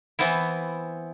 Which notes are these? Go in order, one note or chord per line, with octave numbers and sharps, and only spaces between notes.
E3 B3 C4 E4